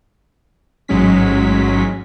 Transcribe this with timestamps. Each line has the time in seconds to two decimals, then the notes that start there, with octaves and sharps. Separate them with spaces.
0.88 A1 G#2 F#3 G#3 C#4 B6